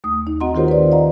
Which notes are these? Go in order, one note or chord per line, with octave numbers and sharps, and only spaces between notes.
D#2 A3 D#6
D#4
C4 F#4 D#5 F#5 A#5 C6
D#3 F4 G4 A#4 C5 C#5
B4 D5
D5 D#5 F5 F#5 A#5